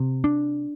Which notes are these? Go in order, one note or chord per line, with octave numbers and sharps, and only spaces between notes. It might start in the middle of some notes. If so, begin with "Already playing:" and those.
Already playing: C3
D4